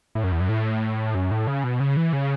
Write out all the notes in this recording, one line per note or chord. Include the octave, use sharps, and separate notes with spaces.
A2
F#2
E2
F#2
A2
F#2
A2
C#3
B2
C#3
E3
C#3